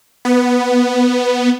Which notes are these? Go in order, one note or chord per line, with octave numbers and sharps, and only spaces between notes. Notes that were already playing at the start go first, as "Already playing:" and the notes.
B3